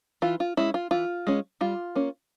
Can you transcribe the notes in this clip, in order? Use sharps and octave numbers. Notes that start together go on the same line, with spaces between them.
E3 F4
F4
G#3 C#4 E4
F4
E3 F4
G#3 C#4
G3 F4
A#3 C#4